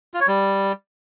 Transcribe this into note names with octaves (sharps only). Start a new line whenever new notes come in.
F4
C#5
G3